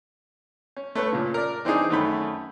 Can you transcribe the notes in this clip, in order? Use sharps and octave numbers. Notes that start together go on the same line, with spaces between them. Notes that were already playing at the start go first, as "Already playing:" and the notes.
C#4
A3 C#4 B4 C#5
A#2 C#3
A#4 D5
E3 C4 D4 D#4 G#4
F#2 D#3 A3 C#5 B5